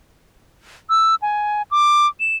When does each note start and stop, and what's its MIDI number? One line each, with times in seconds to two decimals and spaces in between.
0.90 1.15 88
1.22 1.62 80
1.71 2.07 86
2.20 2.36 100